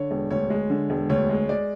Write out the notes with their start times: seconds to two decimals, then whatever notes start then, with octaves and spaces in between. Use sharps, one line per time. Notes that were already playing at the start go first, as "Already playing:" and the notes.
Already playing: D3 C#5
0.11 E1
0.31 D2 C#5
0.50 G#3
0.70 D3
0.90 E1
1.09 D2 C#5
1.29 G#3
1.49 G#3 D5